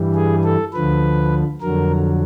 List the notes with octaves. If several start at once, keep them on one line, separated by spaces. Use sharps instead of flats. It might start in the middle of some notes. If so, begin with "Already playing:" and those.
Already playing: G2 E3 G3
G#4
A4
D2 D3 F3 B4
F2 D3 F#3 A#4